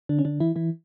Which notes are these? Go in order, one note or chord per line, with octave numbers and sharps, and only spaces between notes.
D3 D4
C#4
D3 D4
E3 E4
E3 E4